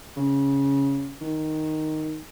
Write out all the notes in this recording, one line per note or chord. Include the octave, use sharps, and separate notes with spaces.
C#3
D#3